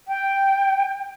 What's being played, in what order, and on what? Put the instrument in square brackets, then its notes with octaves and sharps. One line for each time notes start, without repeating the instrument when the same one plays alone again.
[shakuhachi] G5